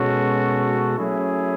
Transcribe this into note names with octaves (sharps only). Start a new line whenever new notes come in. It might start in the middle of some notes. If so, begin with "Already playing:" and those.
Already playing: B2 G#3 C#4 F#4 A4
F#3 A3 C#4 E4 G#4